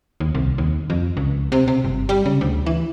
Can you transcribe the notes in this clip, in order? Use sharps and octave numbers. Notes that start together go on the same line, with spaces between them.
D#2
C2
D#2
F2
C#2
C3
C3
G1
G3
C#3
D2
E3